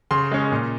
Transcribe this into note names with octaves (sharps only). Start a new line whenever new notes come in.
C#3 C6
G#3 C#4
A#2